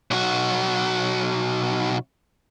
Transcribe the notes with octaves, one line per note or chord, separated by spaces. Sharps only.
B1 F#4